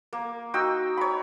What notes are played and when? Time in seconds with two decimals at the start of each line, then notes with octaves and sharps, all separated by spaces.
0.13 A#3
0.54 D#4 F#4 G5 E6
0.97 C#5 B5